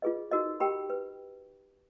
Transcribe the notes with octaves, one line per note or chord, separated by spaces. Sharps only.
F4 G#4 B4 D#5
D#4 F#4 A#4 D#5
G4 A#4 D#5 G5 B5
B4